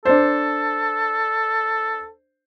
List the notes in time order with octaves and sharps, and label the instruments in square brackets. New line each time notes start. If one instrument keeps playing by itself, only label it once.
[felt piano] D4 C5 [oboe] A4